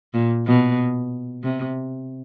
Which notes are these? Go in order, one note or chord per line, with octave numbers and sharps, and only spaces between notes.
A#2
B2
C3